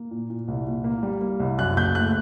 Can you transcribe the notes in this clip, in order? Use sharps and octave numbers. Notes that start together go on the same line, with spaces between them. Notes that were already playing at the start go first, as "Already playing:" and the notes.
Already playing: A#3
A#2
A#2
C2
A#2
A#3
G3
A#3
C2
F#2 F#6
F#1 G6
A3 F#6